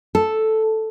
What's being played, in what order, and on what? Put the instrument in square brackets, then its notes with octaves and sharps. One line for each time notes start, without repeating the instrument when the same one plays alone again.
[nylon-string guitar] A4